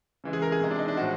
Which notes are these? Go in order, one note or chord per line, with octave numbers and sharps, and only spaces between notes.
C#3 E3 G#3
G#4
A#4
G#4
C3 E3 G#3
D4
D#4
D4
A2 F3 G#3 F#4